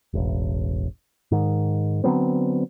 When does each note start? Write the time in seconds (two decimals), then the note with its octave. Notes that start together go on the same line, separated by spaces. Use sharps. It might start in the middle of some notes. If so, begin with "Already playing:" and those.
0.13 E1 A1
1.31 G#2 D#3
2.04 D3 F#3 B3 C4